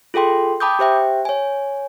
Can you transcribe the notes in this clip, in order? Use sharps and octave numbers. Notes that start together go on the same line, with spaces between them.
F4 G#4 A4 G5 C6
G5 A5 B5 D6 D#6 G6
G4 C5 E5 G5
C#5 G#5